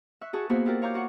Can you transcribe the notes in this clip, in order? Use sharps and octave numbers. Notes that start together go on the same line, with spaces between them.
E5 C#6 F#6
F#4 G#4 A5 C#6
A#3 B3 E4 F#4 G#4 C5
E4 F4 G4 A#4 D5
C#5 F5 A#5 C#6 D6 G6
F4 F#4 C#5 F#5